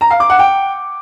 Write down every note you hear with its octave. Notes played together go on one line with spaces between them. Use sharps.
A#5
F5
D6
F#5
G5